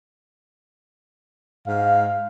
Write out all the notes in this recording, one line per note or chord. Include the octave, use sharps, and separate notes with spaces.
G#2 F5